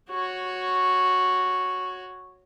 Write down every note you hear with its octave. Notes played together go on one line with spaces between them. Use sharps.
F#4 C#5